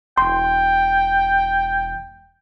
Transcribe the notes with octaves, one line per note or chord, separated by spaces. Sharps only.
E1 G5 C6